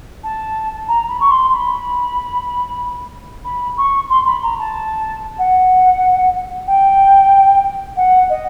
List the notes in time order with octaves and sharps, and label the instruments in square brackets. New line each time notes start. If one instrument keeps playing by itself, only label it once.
[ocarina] A5
A#5
B5
C#6
C6
B5
B5
C#6
C6
B5
A#5
A5
F#5
G5
F#5
D#5